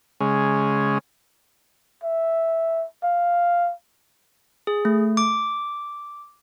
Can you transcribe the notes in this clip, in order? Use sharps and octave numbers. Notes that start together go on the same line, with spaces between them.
C#3 G#3
E5
F5
G#4
A3
D6